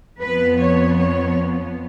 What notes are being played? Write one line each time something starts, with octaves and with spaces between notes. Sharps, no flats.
F2 F3 B3 B4
C#5
C#5